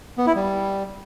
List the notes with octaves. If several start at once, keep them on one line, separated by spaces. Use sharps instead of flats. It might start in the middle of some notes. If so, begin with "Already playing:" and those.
B3
E4
G3